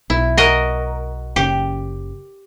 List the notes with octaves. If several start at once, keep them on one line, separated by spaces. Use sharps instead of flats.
B1 E4
F#4 A#4 D#5
F#1 C#3 G4